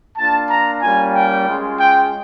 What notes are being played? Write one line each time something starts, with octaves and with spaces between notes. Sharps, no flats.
A#3 D4 F4 A5
A#5
G3 A#3 C#4 F4 G#5
G5
G#3 C#4 F4
G5